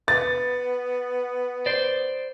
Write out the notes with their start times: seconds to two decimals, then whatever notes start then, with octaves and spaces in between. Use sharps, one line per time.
0.08 B3 A6
1.66 C5 D5